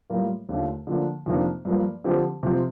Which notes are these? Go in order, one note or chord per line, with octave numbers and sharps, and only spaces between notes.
A2 G3 A#3 F4 A#4
D#2 D3 A3 D4 F4
D3 F3 A#3 D4
F2 C3 D#3 A#3 D4
G2 F3 A#3
D3 F3 C4 G4
C3 F3 C4